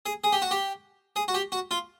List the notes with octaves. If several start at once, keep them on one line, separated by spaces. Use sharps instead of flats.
G#4
G#4
G4
F#4
G4
G#4
F#4
G4
F#4
F4